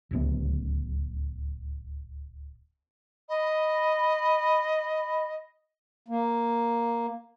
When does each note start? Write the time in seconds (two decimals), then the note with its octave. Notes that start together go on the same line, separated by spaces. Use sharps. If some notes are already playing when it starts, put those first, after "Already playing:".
0.11 D1 C#2 B3
3.29 D#5 B5
6.08 A#3